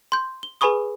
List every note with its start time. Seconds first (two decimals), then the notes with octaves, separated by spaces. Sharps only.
0.12 C6 G6
0.43 G7
0.61 G#4 B4 G#5 B5 C#6 D#6